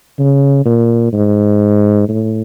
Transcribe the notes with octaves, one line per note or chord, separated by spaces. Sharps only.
C#3
A#2
G#2
A2